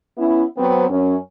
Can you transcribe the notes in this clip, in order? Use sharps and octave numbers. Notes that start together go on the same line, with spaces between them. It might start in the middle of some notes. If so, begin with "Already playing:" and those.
B3 C#4 E4
F#3 B3 C4
F#2 C#4